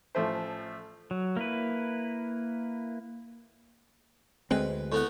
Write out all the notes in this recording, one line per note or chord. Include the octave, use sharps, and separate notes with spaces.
A1 F3 A3 C5
F#3
A#3 E4 B4
D2 G#3 C4 B4
A2 B3 F#5